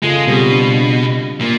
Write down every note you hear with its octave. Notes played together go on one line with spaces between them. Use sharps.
C#3 G#3 F4 A4
B2 G3 C4 C5
D4
A#2 A#3